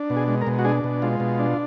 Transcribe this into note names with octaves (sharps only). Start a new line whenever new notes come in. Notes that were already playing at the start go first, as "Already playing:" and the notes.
Already playing: D4
B2
G#4
G#3
A#4
B2
F#4
D4 G#4
B2
G#3 F4
B2
D4